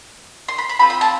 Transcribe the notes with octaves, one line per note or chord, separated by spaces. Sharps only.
C6
B5
B5
C4 F4 G#4 B5
B5
A5